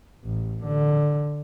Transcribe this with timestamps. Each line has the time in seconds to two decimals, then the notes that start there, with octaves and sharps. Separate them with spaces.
0.25 A1
0.64 D3